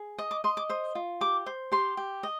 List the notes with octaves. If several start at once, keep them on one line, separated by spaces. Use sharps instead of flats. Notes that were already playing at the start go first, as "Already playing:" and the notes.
Already playing: G#4
D#5 D#6
D6
D#5 C6
D6
C5 D#6
F4
G4 D6
C5
G4 C6
G4
D#5